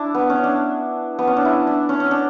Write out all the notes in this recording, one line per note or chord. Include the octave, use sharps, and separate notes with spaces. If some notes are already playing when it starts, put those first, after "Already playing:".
Already playing: D4 E4
B3
C#4
D4
B3
C#4
D4
E4
D4
C#4
C#4
D4